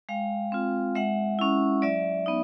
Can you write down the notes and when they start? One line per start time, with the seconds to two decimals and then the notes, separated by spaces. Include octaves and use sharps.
0.09 G#3 F5 G5
0.52 C4 F4
0.95 G#3 E5 F#5
1.39 C#4 E4
1.82 F#3 D5 E5
2.26 B3 D#4